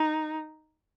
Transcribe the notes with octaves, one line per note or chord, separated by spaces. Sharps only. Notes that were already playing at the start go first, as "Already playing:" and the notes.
Already playing: D#4